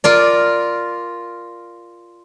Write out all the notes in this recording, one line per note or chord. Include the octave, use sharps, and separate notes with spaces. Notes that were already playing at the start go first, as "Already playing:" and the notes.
F4 A#4 D5